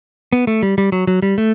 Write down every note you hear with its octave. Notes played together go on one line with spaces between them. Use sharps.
B3
A3
G3
G3
F#3
F#3
G3
A3